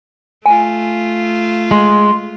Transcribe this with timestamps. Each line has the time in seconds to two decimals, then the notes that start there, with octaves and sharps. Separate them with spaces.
0.46 A3 F4 G#5
1.71 G#3 C6